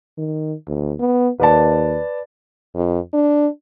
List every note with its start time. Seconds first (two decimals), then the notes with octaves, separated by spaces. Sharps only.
0.18 D#3
0.68 D2
0.99 B3
1.40 D#2 B4 D5 A5
2.75 F2
3.13 D4